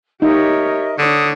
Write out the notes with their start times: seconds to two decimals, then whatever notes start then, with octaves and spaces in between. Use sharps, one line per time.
0.22 D#4 G4 A#4 C#5 D#5 E5
0.99 D3 D4 C#5 D#6